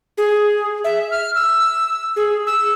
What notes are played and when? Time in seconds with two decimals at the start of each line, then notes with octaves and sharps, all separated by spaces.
0.18 G#4
0.84 E5
1.11 F6
1.35 E6
2.16 G#4
2.47 E6